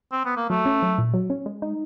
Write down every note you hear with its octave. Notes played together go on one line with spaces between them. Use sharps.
C4
B3
A#3
F#3 A3
C#4
F#3
A#2
F#3
C#4
G#3
D#4